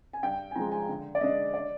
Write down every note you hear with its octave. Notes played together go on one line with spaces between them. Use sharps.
G#5
G2 G5
G#5
F3 G#3 A#5
G#5
D3
D5
G#3 D4 D#5
D5